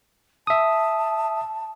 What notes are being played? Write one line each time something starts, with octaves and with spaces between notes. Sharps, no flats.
E5 A5 D#6